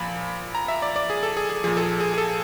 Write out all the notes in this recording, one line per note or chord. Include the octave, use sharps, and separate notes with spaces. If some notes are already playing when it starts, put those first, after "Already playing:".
Already playing: A#2 F3 B5
A#5
E5
D5
D5
G#4
A4
G#4
G#4
A#2 F3 G#4
A4
G#4
G#4
G#4
A4